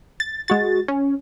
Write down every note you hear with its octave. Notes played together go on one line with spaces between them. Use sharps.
A6
G#3 F#4 A6
C#4